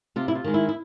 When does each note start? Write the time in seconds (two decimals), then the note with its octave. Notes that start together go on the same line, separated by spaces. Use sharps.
0.16 C3 F4
0.28 E4
0.35 F4
0.44 D#3 G#3
0.54 E4
0.69 E4